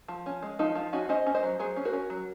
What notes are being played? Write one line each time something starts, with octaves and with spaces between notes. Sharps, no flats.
F3
C#4
G#3
F3 D#4
F3 F4
C#4 D#4 F#4
C#4 C5 D#5
C#4
C5 D#5
F#3
F#3 G#4 C5
C#4
F#4 A#4
C#4
F#3